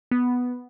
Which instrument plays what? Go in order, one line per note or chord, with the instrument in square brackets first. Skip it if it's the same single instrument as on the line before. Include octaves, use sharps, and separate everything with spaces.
[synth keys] B3